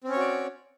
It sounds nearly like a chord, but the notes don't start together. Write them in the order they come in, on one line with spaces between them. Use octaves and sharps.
C4 C#4 C#5 F#4 D5